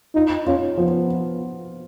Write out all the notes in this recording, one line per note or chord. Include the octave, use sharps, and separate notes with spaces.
D#4 F4
C#4 F4
F3 B3